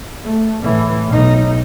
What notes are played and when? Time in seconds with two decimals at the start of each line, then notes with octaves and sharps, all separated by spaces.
0.24 A3
0.63 A2 E3
1.08 B1 D#4